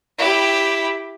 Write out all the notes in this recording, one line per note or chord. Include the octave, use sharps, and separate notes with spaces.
E4 G4